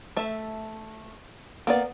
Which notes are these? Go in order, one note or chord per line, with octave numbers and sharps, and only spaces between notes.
A3 E5
A#3 B3 D5